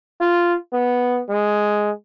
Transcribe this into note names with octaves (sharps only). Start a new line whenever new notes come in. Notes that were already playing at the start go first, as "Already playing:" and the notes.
F4
B3
G#3